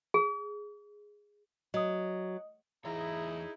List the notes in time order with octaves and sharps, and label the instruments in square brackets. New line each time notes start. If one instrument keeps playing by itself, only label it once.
[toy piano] G#4
[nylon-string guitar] F#3 [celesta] D#5 D#6
[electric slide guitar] E2 E3 C#5 [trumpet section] D#4 E4 [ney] G#4 [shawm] A#5